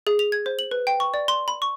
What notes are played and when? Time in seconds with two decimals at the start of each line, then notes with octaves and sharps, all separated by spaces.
0.07 G#4
0.19 F7
0.32 G#6
0.46 C5
0.59 F#7
0.71 B4
0.87 G5
1.00 C#6
1.14 D5
1.28 C6
1.48 B5
1.62 C#6